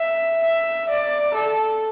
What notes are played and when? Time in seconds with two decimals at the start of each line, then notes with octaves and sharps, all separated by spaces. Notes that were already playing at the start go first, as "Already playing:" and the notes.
Already playing: E5
0.43 E5
0.89 D5
1.34 A4